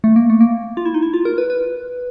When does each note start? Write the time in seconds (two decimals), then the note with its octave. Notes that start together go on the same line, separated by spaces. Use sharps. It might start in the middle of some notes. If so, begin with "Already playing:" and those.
0.04 A3
0.16 A#3
0.30 A3
0.41 A#3
0.77 F4
0.86 E4
0.94 D#4
1.03 E4
1.14 F4
1.25 A#4
1.38 B4
1.50 B4